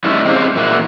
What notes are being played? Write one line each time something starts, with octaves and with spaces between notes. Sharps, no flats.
G3 A3 C#4 D#4 E4
G#3 C4 C#4 G4 C5 F5
A#2 E3 A#3 F#4